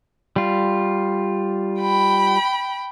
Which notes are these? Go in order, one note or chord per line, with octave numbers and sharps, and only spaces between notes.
G3 F4
G5 B5